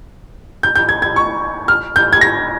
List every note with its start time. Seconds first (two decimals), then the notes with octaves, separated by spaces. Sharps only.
0.63 G6
0.76 G6
0.89 G#6
1.02 G#6
1.16 C#6
1.68 F6
1.96 G6
2.13 G#6
2.21 A#6